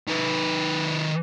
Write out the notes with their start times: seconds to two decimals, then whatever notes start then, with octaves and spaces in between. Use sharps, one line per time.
0.08 D#3 B4